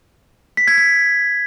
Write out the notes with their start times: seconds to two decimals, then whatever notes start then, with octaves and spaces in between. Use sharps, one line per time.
0.57 B6
0.67 G#6
0.78 G#6